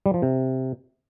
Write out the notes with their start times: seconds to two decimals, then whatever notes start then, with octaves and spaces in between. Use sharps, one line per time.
0.06 G3
0.14 F3
0.22 C3